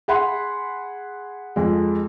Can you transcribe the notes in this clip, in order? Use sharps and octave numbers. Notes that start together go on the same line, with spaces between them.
G#4 F#5 B5 C6
F2 G#3